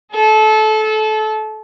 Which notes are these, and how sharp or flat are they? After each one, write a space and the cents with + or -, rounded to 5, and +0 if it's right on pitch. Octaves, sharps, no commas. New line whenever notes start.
A4 -25